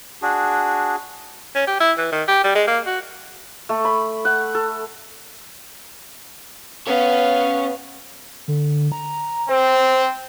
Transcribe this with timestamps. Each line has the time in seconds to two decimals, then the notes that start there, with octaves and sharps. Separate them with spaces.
0.22 D4 F#4 G#4
1.55 C#4
1.67 G4
1.80 E4
1.98 E3
2.12 D#3
2.28 G4
2.44 G3
2.55 G#3
2.67 A#3
2.86 F#4
3.69 A3
3.85 B5
4.25 F#5
4.55 A4
6.87 B3 C#4 C#5 F5
8.48 D3
8.92 A#5
9.49 C4 C5